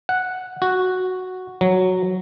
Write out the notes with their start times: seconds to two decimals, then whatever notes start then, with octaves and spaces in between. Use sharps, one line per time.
0.09 F#5
0.62 F#4
1.61 F#3